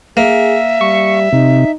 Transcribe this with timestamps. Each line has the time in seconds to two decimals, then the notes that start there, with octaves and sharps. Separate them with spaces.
0.17 A#3 G#4 E5
0.81 G3 C#6
1.33 C3 D#4